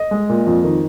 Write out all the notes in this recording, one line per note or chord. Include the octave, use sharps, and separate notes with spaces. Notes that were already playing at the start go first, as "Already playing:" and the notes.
Already playing: D#5
G#3
A#2
F2
D#3